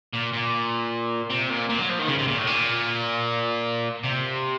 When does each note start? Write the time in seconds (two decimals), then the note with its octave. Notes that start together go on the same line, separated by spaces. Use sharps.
0.13 A#2
0.33 A#2
1.30 C3
1.50 A#2
1.70 A#2
1.79 F#3
1.90 F3
1.99 D#3
2.08 C#3
2.18 C3
2.28 A#2
2.38 A2
2.47 A#2
4.04 C3